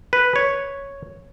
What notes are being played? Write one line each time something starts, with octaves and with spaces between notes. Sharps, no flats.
B4
C#5